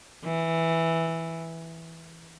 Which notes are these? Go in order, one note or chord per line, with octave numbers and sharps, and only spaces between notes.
E3